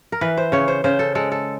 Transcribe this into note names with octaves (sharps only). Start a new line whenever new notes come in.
A#4
E3 B4
C5
C#3 C#5
C5
C#3 C5
A4
G#3 A4
A4